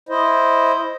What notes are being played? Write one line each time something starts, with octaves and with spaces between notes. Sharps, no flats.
E4 C5 D#5